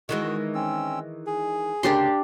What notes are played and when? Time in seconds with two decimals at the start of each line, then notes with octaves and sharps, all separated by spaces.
0.09 D#3 E3 G#3 F#4
0.55 C4 C#4 E6
1.26 G#4
1.83 D2 C#3 A#3 D4 G4 C6